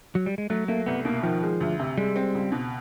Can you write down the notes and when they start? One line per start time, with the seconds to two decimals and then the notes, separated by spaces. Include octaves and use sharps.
0.15 F#3
0.26 G3
0.38 G#3
0.50 F#3 A3
0.68 A3 A#3
0.86 C2 B3
1.05 B2 A#3
1.23 D#3 F3
1.43 G#3
1.60 D2
1.79 C3
1.98 G3 G#3
2.16 C4
2.35 C#2
2.52 B2